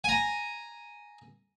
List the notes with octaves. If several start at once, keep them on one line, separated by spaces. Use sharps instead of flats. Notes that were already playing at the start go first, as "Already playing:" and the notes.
G#5 A#5